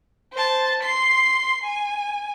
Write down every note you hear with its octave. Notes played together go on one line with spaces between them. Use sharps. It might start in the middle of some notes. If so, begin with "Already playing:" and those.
C5 A5
C6 C7
G#5